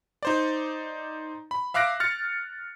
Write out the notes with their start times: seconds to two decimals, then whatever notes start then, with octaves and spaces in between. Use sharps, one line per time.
0.23 D#4 C5 D5
1.51 B5
1.74 E5 F5 D6 F#6 A#6 D7
2.00 F6 A6 C#7